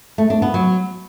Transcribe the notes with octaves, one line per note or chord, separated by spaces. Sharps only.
A3
D4
B3
F#3